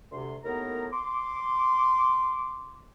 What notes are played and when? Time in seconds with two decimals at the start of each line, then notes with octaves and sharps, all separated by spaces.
0.12 D2 C3 C6
0.45 D#2 A2 B3 A#4 A#5
0.93 C6 D6